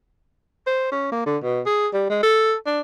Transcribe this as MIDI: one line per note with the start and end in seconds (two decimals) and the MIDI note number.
0.67 0.87 72
0.92 1.10 61
1.12 1.25 58
1.26 1.37 50
1.43 1.61 47
1.66 1.87 68
1.93 2.05 55
2.10 2.22 56
2.23 2.54 69
2.66 2.81 62